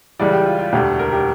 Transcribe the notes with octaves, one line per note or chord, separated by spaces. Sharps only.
C#2 C#3 E3 G3 D5
G4
F4
F4
E1 D2 D3 G4
A#4
G4